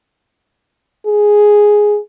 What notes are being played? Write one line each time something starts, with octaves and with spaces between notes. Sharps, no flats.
G#4